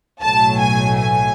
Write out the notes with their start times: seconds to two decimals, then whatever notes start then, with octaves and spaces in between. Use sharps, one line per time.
0.22 B1 A2 F#3 A3 A5
0.61 G#5
1.00 G#5